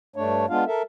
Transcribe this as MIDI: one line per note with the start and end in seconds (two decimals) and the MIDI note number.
0.16 0.46 43
0.16 0.46 57
0.16 0.46 62
0.16 0.46 73
0.49 0.64 56
0.49 0.64 59
0.49 0.64 62
0.49 0.64 65
0.49 0.64 77
0.67 0.82 69
0.67 0.82 70
0.67 0.82 76